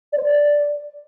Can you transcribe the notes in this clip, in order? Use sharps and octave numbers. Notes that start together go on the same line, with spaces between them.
D5
C5
D5